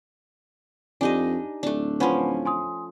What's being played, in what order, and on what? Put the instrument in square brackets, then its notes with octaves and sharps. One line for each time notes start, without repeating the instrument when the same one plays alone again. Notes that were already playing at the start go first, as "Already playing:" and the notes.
[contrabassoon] F2 [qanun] D4 D#4 D#5 [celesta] G4 G#5
[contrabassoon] D1 [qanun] A3 D4
[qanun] F3 C#4 [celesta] B4 F#5 B5
[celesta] G#5 C6 D#6